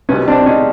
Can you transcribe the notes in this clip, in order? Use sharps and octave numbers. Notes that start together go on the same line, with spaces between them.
C2 B2 G3 B3 C#4
C4 D4
C#4 D#4